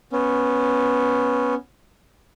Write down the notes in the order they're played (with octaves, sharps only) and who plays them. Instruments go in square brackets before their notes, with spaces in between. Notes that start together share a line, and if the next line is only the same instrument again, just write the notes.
[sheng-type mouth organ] B3 C#4